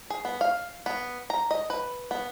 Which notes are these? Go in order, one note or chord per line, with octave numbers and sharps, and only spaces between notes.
G#4
B3
F5
B3
A#5
D#5
B4
B3